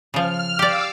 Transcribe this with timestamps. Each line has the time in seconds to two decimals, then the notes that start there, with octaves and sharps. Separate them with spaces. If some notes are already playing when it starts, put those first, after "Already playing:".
0.14 C#3 F3 F6
0.59 G4 D5 F5 D6 E6